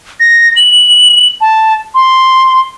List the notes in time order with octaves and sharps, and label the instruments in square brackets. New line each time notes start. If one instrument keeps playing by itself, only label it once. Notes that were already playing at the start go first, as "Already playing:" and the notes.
[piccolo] A#6
F#7
A5
C6